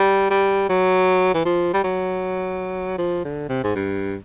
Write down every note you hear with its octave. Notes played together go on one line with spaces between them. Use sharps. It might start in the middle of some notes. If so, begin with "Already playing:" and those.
Already playing: G3
G3
F#3
E3
F3
G3
F#3
F3
D3
C3
G#2
G2